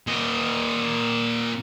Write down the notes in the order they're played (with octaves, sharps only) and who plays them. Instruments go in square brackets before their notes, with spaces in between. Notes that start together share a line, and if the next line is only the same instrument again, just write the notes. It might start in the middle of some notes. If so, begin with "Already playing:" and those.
[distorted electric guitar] A#2 D#5